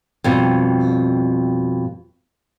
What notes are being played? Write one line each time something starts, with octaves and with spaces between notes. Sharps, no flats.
F2 B2 G3